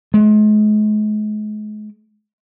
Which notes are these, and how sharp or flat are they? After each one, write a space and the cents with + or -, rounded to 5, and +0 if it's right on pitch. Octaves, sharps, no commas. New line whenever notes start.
G#3 +40